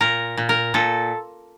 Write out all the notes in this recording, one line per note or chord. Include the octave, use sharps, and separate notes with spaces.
A#2 A#4
A#2
A#4
A#2 A4